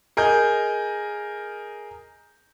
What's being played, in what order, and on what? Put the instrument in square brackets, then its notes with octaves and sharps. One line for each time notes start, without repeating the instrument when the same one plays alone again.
[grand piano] G#4 A#4 D#5 G6